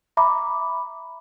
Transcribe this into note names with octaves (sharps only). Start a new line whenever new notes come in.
E5 A#5 B5 D6